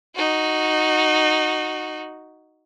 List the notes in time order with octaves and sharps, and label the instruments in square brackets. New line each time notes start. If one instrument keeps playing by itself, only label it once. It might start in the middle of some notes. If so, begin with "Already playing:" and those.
[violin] D#4 F#4